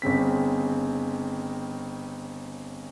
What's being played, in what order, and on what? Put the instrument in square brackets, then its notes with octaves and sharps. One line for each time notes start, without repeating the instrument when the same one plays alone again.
[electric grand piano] G1 C#3 C4 B6